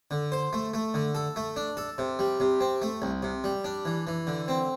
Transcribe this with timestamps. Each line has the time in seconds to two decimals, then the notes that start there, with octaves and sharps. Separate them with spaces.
0.11 D3
0.32 C5
0.53 A3
0.74 A3
0.94 D3
1.15 A4
1.36 A3
1.56 D4
1.77 A4
1.98 C3
2.19 G3
2.40 C3
2.61 C4
2.82 A3
3.02 C2
3.23 C3
3.44 G3
3.64 D4
3.85 E3
4.07 E3
4.27 D3
4.48 C4